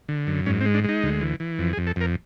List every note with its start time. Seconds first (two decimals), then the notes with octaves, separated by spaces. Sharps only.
0.09 D3
0.27 F#2
0.46 G#2 C#4
0.61 C4
0.66 G#3
0.74 D4
0.84 G#3 D#4
1.03 D2
1.21 E3
1.40 E3
1.58 F2
1.73 G#4
1.78 F2
1.87 A4
1.96 F2 A#4